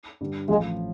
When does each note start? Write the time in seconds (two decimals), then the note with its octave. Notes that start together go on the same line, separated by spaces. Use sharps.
0.21 G2 D3 G3
0.49 A1 A2 F3 G#3